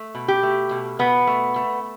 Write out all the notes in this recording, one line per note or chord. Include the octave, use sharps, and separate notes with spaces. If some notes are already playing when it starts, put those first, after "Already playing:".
Already playing: A3
B2
G4
A3
B2
B2 B3
A3
A3